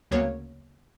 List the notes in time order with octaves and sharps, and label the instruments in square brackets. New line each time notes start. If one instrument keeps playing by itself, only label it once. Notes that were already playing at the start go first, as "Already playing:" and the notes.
[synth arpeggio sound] D2 C#3 F#3 A#3 B3 C#5